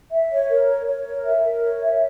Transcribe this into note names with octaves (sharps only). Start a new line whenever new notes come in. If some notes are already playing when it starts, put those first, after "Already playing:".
E5
C#5
A#4
C#5
C#5
A#4
E5
A#4
C#5
E5